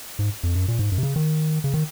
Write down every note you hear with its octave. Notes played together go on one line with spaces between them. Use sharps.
G#2
F2
F#2
A#2
G#2
F#2
C3
C#3
D#3
C#3
D#3